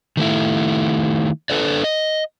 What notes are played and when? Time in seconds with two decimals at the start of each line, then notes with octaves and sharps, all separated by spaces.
0.17 D#3 A3 E4
1.50 D4 A4 B4 D5
1.84 D#5